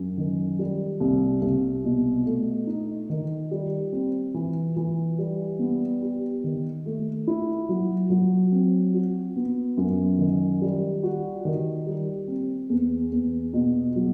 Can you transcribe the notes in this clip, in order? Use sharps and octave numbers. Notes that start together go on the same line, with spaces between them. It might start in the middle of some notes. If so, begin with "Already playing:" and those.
Already playing: F#2
D#3
G3
C2
C2
B2
A3
D#4
D#3
G3
C4
E3
E3
G3
B3
G4
D#3
A3
E4
F#3
F#3
C4
F#4
B3
F#2
D#3
G3
F#4
D#3
G3
C4
E2
E2
B2
F#3